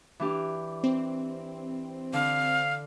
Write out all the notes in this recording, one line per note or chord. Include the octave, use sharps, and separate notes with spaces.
E3 D4 G4
C4
D3 F5